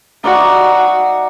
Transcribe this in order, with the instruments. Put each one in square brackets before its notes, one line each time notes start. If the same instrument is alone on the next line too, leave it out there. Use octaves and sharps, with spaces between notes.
[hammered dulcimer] D#4 D5 E5 [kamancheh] F#4